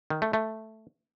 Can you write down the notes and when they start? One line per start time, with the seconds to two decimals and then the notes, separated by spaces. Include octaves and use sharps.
0.10 D#3
0.22 A3
0.33 A3